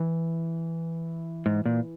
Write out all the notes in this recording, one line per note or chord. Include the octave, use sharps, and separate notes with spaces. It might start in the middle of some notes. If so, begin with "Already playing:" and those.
Already playing: E3
G#2
A#2